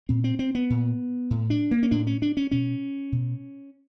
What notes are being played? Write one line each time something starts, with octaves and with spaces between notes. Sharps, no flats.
A#2 C4
C4
C4
B3
A#2
A2
D4
A#3
C#4
A2 D4
C#4
D4
C#4
B2 C#4
B2